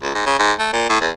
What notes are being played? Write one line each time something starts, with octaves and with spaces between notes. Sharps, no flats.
C#2
G#2
C#3
G#2
A3
A#2
A2
E2